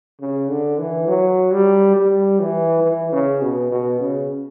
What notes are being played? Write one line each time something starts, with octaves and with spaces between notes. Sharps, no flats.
C#3
D3
E3
F#3
G3
G3
E3
E3
C#3
B2
B2
C#3